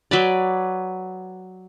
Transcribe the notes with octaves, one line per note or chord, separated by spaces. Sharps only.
F#3 B4 D5